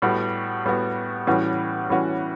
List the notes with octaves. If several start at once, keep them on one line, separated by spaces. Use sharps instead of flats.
A2 G3 B3 F#4
A2 G3 B3 F#4
A2 E3 G3 C#4 F#4
A2 E3 G3 C#4 F#4